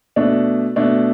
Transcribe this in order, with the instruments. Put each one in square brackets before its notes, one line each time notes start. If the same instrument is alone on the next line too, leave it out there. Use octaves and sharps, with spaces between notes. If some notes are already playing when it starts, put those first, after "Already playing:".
[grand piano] B2 A3 D4
B2 A3 D4